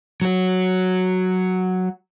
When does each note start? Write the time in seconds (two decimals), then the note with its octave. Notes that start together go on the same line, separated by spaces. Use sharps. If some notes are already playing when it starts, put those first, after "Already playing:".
0.22 F#3 F#4